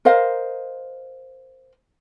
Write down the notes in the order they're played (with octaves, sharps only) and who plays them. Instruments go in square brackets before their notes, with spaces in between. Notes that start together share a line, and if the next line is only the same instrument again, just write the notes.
[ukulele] A#4 C5 D#5 F5